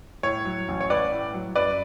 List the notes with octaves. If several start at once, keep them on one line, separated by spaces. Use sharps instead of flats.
A2 C#5
F#3
A1
C#5
A1 B4 D5
A2
F#3
F#2 B4 D5